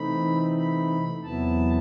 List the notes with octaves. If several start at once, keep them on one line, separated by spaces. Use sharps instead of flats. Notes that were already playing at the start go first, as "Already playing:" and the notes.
Already playing: C3 E3 A3 C4 D#4 B5
B5
E2 C3 F#3 B3 E4 A5